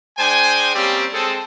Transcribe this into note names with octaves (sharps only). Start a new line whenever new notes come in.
G#3 D4 C5 G5 G#5
G3 A#3 C4 C#4 G4 D5
G#3 C4 G#4 A4